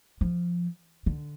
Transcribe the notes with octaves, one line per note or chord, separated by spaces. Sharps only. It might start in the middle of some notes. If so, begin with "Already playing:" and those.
F3
D3